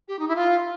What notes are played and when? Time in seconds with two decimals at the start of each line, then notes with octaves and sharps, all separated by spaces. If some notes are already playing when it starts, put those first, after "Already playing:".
0.08 G4
0.19 D#4
0.28 E4
0.35 F4